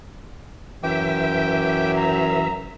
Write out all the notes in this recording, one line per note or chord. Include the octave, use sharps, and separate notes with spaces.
F#2 E3 E5 G5 D6
A#5